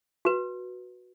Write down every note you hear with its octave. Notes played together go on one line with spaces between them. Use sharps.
F#4 B4